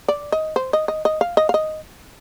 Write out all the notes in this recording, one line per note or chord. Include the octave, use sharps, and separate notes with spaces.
D5
D#5
C5
D#5
D#5
D#5
F5
D#5
F5
D#5